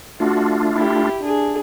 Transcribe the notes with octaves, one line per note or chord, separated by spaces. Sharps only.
A3 D4 F4 F#4
E4 G4
D4 G#4